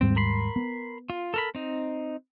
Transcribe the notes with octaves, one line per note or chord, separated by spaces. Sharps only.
D#2 G#2 G3 C4
A#4 B5 C6
B3
F4
A4 A#4 B5
C4 D#4